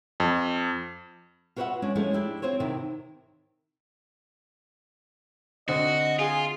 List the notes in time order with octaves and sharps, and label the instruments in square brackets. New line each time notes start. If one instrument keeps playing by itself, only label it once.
[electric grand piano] F2
[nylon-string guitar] F4 F#4 B4 C#5 E5 F#5
G#3 C#4 D4
E3 F3 G#3 A3 C#4 E4
D4 E4 G4
C4 F4 C5 C#5
C3 D#3 E3 E4
[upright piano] D3 C4 [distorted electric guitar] F#4 [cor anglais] D#5
[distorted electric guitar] F4 [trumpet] G#4